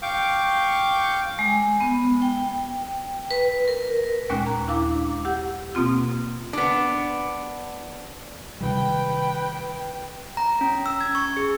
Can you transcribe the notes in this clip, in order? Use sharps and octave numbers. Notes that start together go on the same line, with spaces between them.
F5 G5 C#6 D6 G6
G#3
B3
G5
B4
A#4
D#2 A#2 G#3 C#4 F#6
A#5
D4 E4 F5 D6
G4 F#5 E6
B2 A#3 C4 F4
B3 D4
C3 D#3 G3 B4 G5
A#5
C#4
E6
G#6
C#6
G#4